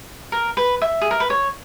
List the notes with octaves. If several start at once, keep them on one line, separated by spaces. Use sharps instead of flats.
A#4
B4
E5
G#4
A#4
B4
C#5